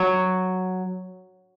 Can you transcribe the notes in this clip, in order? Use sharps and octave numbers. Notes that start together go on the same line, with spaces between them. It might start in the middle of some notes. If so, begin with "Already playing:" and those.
Already playing: F#3